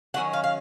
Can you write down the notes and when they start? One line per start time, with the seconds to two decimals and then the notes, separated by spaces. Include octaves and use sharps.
0.14 D#3 F#3 C#4 F#5
0.33 F5
0.44 F5